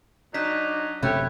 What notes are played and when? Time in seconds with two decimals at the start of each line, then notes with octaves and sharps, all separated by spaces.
0.34 F#3 D4 D#4 F#6 B6
1.03 F#1 F#2 C3 A3 G4 C#5 B5 F#6